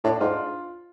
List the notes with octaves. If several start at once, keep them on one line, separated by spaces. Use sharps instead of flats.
A2 D4
G#2 F4